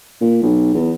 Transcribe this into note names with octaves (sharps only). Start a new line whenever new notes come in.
A#2
B1
E2